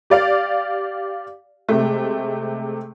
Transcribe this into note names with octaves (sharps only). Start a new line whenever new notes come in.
G4 D5 F5
C3 G#3 A3